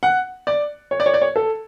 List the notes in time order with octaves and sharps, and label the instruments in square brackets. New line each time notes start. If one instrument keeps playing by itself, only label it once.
[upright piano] F#5
D5
C#5
D5
C#5
D5
C#5
A4